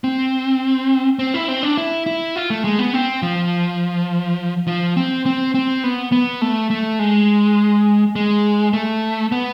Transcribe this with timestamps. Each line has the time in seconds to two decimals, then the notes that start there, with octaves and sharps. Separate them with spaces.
0.04 C4
1.19 C4
1.34 E4
1.48 C4
1.63 D4
1.78 E4
2.06 E4
2.36 F4
2.50 A3
2.65 G#3
2.79 B3
2.93 C4
3.22 F3
4.67 F3
4.97 C4
5.26 C4
5.54 C4
5.84 B3
6.12 B3
6.41 A3
6.71 A3
6.99 G#3
8.16 G#3
8.73 A3
9.32 B3